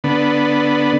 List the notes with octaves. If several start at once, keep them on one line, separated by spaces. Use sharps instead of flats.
D3 B3